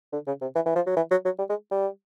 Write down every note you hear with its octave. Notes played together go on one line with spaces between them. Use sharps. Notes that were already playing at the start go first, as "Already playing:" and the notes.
D3
C#3
C3
E3
E3
F3
F#3
E3
F#3
F#3
G3
G#3
G3